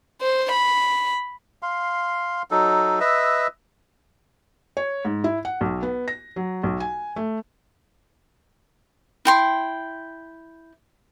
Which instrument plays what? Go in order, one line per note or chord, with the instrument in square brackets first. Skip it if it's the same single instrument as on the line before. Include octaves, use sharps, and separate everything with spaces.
[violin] C5
B5
[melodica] F5 C6
F#3 D#4 A4
B4 D#5 E5 E6
[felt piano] C#5
G#2
E4
F#5
B1
B3
A#6
F#3
B1
G#5
A3
[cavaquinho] E4 G5 C6